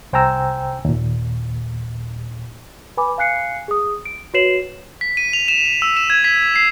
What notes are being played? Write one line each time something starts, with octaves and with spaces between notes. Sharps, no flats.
C2 C5 G5 G#5 A#5 E6
D#2 A#2
B4 G#5 B5 D6
F5 G#5 F#6 C7 C#7
G#4 D#6
D7
F#4 B4 C#5 C7 E7 F#7
B6
D#7
F7
E7
E6
E7
G#6
B6
C7